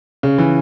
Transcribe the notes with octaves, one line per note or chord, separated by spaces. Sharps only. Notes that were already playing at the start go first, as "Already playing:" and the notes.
C#3
E3